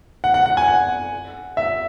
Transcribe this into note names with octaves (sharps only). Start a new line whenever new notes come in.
F#5
F#5
F#5
G#5
F#5
E5